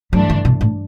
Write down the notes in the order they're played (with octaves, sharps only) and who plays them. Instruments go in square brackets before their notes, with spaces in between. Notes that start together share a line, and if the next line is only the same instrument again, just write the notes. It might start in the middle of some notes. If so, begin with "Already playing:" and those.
[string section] G2 E3 A3 D4 [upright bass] F#3
[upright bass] D3
B2
A2